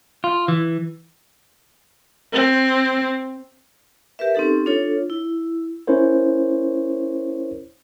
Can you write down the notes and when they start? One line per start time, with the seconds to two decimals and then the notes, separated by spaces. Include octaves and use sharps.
0.24 F4
0.48 E3
2.33 C4
4.19 G4 A#4 B4 E5
4.35 C4 C#4 D#4 G4 A4
4.66 D4 F4 A4 C#5
5.10 E4
5.87 C#4 E4 A#4 C5 C#5